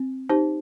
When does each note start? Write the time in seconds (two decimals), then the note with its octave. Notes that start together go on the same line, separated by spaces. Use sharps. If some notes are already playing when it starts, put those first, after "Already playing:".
Already playing: C4
0.29 D#4 G4 C5